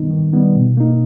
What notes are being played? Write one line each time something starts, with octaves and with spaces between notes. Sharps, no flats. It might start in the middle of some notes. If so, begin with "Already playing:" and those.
Already playing: D#3 G3 B3 D#4
D#3
G3 B3 D#4
B2
A#3 D#4